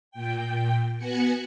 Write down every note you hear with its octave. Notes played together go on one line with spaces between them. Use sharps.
A#2 G5
B3 F#4 F#5 G#5 C#7